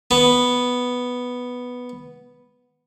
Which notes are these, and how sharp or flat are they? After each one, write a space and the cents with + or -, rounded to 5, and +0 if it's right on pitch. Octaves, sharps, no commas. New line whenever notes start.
B3 +0